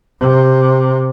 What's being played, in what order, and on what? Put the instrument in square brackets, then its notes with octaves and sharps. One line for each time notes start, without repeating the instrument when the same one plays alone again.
[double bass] C3